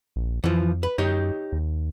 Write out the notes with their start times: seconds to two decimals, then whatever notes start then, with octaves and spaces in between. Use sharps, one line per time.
0.16 A#1
0.44 F2 E3 F3
0.83 B4
0.98 F#2 D#4 G4 C#5
1.52 D#2